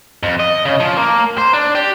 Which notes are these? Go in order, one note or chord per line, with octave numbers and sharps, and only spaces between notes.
F2
D#5
C#3
F3
A#3
C5
D4
G4